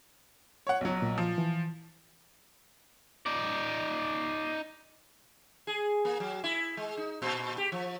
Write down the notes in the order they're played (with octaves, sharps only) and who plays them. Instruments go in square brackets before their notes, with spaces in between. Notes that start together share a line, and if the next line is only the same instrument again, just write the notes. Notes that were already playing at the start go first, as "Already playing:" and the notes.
[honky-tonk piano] C#5 F#5
B1 F#3
[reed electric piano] A#2
[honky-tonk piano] F3
[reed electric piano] E3
[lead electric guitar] D#4 D5
[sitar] G#4
A#3
F#3
E4
G#3
D#4
A#2
G4
F3